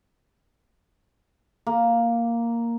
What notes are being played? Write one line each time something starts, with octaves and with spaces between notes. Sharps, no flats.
A#3